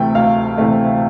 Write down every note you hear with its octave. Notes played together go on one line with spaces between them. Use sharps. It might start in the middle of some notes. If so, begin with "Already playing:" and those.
Already playing: D2 C3 E3 A3 G5
D2 F5
C3 E3 A3